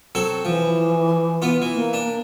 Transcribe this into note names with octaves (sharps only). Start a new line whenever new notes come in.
F#3 C4 A4
E3 F3
B3 F4
E3
A#3
D4